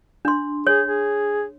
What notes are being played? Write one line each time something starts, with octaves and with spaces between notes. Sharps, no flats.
D4 C6
G#4 C#5
G#4